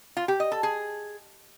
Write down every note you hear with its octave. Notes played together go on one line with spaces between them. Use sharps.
F4
G4
D#5
A4
G#4